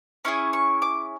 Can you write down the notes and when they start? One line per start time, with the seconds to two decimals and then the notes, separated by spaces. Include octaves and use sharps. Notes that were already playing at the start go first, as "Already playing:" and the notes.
0.25 C#4 E4 G#4 C#6
0.53 C#6
0.82 D6